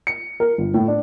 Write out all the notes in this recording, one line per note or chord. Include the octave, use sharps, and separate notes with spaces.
C#7
A#4
G1
A2
D4